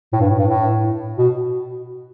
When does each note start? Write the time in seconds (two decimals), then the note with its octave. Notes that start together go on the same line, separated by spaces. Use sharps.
0.13 A2
0.20 G2
0.30 A2
0.39 G2
0.47 A2
1.18 B2